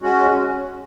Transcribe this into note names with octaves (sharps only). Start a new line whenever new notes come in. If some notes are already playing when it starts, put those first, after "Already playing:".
G#3 C#4 F#4